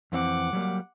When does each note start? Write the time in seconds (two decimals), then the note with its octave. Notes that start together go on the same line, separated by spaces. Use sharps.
0.12 F2 E3 C4 F#5 D6
0.53 F#3 G3 A#3